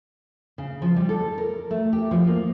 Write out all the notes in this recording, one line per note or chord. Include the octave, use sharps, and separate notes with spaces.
C#3
F3
G3
A4
A#4
A3
G4
F3
A#3